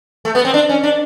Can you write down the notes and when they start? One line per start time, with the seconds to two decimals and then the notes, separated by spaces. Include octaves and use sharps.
0.25 A3
0.35 B3
0.45 C4
0.54 D4
0.69 C#4
0.84 D4